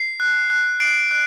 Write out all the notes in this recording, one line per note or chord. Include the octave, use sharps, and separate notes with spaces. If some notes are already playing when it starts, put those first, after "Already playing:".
Already playing: C7
F#6
F#6
F#6 C7 D7
F#6